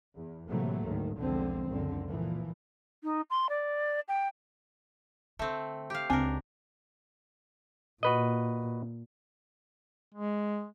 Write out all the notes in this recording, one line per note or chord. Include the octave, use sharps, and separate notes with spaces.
E2
A2 C3 E3 F#3 A3 A#3
D2 G#2 D#3
B1 E2 D3 F3 G#3 C4
C#2 F#2 A#2 D3 C4
A#2 E3 F3
D#4
C6
D5
G5
D3 A3 C4
G4 F5
C#2 C4 D4 A#4 G#5
A#2 F#4 B4 D#5
G#3